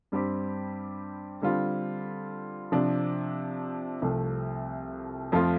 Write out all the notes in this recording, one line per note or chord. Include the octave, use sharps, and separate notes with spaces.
G2 G3 C4 G4
D3 G3 C4 F4
C3 F3 D4
C2 C3 F3 A3
F2 F3 A3 F4